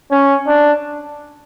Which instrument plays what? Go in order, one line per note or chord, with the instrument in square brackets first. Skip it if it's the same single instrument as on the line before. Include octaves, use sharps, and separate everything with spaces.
[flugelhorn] C#4
D4